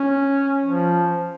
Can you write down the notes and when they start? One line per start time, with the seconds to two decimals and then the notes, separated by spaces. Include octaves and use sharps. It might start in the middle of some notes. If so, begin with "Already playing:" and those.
Already playing: C#4
0.66 F3